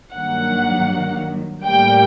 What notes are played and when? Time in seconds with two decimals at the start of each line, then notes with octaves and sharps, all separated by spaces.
0.15 G2 D#3 F#3 A#3 F#5
1.65 A2 G3 A#3 G5